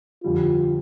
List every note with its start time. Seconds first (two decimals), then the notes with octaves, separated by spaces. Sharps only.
0.23 F2 D3 G3 F4